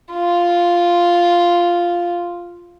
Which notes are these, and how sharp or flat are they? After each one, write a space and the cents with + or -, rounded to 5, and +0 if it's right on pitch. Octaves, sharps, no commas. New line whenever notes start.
F4 -5